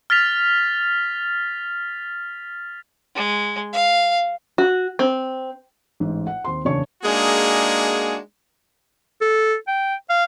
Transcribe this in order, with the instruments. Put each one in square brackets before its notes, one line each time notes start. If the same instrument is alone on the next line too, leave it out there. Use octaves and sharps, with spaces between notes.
[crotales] F6 A6 B6 F7
[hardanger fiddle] G#3
F5
[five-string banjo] F#4
C4
[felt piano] A1 G#2
F#5
D#2 C4 C6
F#1 E2 C#3 D4 C#5 C#6
[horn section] G#3 A#3 D4 D#4 F#4 G#4
[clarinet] A4
G5
F5